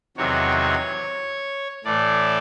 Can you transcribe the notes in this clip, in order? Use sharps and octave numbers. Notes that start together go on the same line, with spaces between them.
E2 C3 D#3 F#3 C#5
A2 E3 A3 D5